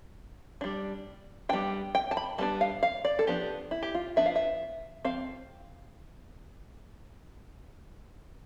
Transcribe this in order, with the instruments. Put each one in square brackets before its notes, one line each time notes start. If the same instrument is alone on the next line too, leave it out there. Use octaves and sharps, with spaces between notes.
[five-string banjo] G3 D4
G3 B3 D4 G5
G5
A5
B5
G3 B3 D4 A5
F5
F5
D5
A4
F3 B3 D4 G4
E4
G4
F4
F3 B3 D4 E5
F5
E5
F3 C4 F5